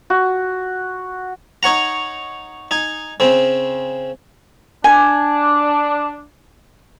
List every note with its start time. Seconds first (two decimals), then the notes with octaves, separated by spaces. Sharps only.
0.10 F#4
1.63 D#4 C#5 F#5 A#5
2.71 D#4 G#5
3.20 C#3 C4
4.84 D4 G#5